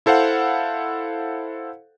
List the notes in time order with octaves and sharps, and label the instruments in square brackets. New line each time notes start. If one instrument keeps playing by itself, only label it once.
[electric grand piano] E4 A4 C5 F5 F#5